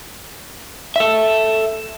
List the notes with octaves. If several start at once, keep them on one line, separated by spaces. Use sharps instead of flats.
A4 E5